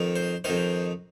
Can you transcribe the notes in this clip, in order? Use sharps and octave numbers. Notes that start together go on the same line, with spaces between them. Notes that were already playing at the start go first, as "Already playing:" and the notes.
Already playing: F2 D#3
C5
F2 D#3 C5